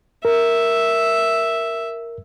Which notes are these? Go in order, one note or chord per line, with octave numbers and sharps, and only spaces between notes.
A#4 E5